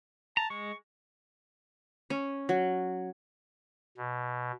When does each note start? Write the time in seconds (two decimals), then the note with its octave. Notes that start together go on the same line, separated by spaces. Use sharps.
0.37 A5 A#5
0.50 G#3 C#6
2.10 C#4
2.49 F#3
3.97 B2